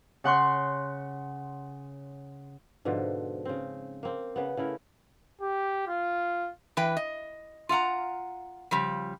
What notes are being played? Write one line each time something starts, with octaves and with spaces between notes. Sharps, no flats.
C#3 F#5 C6 C#6
G#2 B2 D3 F3
C#3 C4
A#3 C4
C#3 B3
C#3 A3 E4 A#4
G4
F4
E3 B4 G5
D#5
F4 F5 F#5 A#5
C#3 F3 G3